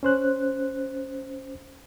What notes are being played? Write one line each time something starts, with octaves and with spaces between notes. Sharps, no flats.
C#4 C5 F#6